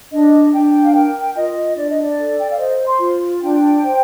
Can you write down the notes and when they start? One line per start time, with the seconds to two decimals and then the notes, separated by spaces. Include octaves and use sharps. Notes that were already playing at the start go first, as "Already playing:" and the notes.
0.12 D4 D#5
0.53 D4 G5
0.82 F5
0.94 A#4 G5
1.36 F4 D#5
1.76 D4 D5
1.90 D#5
2.03 D5
2.18 A4
2.40 G5
2.49 F5
2.58 C5 D#5
2.86 C6
3.00 F4
3.41 D4 G5
3.82 C5